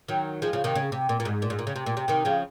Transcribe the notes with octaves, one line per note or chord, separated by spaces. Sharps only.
D#3 F#3
F3 G#3
C#3 F3
C3 D#3
C#3
C3
A#2
A#2
G#2
A#2
G#2
A#2
C#3
C3
A#2
C3
C3 D#3
C#3 F3